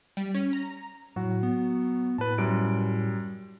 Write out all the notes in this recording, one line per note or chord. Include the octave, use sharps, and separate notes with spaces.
G3
C#4
A#5
A2 F#3 F#4
B3
A2 B4 A5
F#2 G3 D7